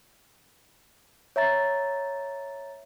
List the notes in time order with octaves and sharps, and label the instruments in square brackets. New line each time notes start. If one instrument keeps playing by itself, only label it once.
[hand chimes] C#5 E5 A#5 A6